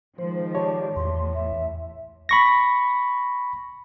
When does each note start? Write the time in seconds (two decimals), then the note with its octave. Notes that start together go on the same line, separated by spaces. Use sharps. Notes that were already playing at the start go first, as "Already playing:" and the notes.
0.18 D#3 F3 G#3 C5
0.55 G4 C#5 D5 A5
0.96 E2 A2 E3 C6
1.35 E5
2.29 B5 C#6 A#6